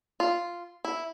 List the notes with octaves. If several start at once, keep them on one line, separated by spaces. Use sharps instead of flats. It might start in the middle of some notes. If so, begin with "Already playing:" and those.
F4
E4